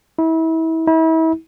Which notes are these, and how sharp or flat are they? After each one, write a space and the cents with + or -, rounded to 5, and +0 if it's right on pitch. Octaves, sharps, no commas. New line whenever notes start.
E4 -30
E4 -35